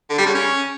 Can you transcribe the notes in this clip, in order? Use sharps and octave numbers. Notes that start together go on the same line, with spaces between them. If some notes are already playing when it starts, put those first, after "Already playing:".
D3
G3
C#3
C#4